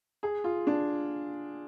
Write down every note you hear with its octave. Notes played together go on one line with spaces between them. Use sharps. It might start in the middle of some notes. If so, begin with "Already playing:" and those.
G#4
F4
D4